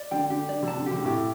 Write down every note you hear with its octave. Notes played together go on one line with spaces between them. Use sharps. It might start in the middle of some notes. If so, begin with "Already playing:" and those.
Already playing: D5
D3 G5
D3 G4
D5
C3
A5
D3
C3 G4
G3
A2 A3 G4